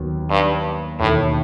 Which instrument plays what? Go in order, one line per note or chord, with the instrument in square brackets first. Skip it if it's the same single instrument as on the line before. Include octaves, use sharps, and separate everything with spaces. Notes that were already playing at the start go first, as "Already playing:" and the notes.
Already playing: [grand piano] D#2 D#3 F#3 B3
[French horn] G2
[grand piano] E1 D#2 D#3 [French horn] A2